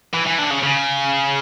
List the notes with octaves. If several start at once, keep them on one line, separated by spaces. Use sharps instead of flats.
E3
E3
D3
C#3
C#3